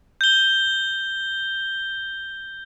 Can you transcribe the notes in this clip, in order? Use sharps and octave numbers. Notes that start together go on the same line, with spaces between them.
G6 G7